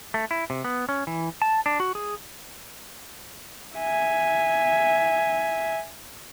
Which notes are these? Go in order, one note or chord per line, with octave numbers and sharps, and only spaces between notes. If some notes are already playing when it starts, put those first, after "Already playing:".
A3
E4
C3
B3
C#4
E3
A5
D4
F#4
G#4
E5 G#5